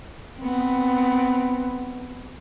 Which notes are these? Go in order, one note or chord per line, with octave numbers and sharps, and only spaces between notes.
B3 C4